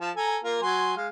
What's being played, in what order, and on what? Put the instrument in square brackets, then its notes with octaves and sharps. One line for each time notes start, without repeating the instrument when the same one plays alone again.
[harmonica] F3 A5
A4 G#5 A#5
A#3 F4 A#4
F#3 G#5 C6
G#3 F5